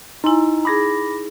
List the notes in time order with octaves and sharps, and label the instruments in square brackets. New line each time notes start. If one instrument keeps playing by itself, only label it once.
[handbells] D#4 [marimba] E4 G#5 C6
[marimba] D#4 G#4 [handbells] B5 D6 A#6